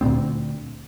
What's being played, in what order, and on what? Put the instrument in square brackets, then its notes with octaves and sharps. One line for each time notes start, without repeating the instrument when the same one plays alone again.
[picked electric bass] D2 A#2 B3 C4